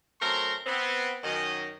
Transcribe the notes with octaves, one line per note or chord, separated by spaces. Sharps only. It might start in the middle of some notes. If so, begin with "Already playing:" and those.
F#2 A3 C4 A#4 A#5 C6
B3 C4
F#2 D#3 D#5